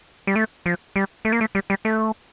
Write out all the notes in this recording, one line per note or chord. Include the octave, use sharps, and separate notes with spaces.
G3
A3
F3
G3
A3
A#3
A3
G3
G3
A3